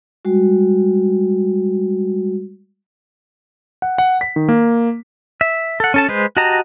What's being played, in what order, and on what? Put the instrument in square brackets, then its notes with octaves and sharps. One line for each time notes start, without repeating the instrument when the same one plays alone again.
[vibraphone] G3 G#3 F#4
[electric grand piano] F#5
F#5
B6
D#3
A#3
[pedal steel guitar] E5
A4 F#5
C#4 A4 A5
G#3 B4 C5
F#4 G4 D#5 A5 A#5